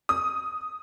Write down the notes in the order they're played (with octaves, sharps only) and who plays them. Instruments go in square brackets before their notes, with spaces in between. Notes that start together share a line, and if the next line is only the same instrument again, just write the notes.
[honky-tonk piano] D#6